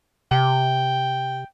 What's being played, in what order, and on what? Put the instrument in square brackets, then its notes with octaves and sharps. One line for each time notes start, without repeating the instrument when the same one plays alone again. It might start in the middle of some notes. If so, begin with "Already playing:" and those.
[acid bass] C3 [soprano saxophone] G5